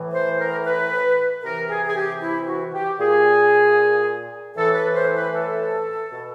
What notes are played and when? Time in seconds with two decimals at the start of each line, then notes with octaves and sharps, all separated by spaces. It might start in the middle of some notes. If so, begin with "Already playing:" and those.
Already playing: A2 E3
0.13 C5
0.39 A#4
0.65 B4
1.43 C3 E3 A#4
1.69 G#4
1.87 G#4
1.96 G4
2.22 E4
2.47 F#4
2.74 G4
2.99 A#2 G#4
4.56 A2 E3 A4
4.75 B4
4.95 C5
5.15 B4
5.34 A4
6.13 B2